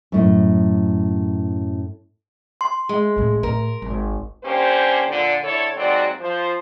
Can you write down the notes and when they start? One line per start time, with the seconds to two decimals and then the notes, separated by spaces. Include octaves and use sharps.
0.12 F#2 A2
2.61 C6
2.89 G#3
3.16 A1 A2
3.43 A2 A#4
3.82 G#1
4.44 D3 A#3 C#4 G4 C5
5.09 A#2 D3
5.43 D3 E4 A4 C#5
5.76 D#2 G#2 F#3 C4 F#4 D5
6.19 F3 C5